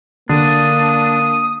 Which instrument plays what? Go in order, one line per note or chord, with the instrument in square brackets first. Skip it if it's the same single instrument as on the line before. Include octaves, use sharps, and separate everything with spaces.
[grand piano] D3 [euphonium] A#3 [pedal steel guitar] D4 [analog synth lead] D#6